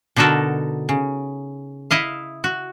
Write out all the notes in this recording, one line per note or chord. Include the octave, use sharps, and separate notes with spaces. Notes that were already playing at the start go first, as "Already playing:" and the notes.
B2 D3 D#4 F#4 A4 A#4
C#3
E4 D#5 F5
F#4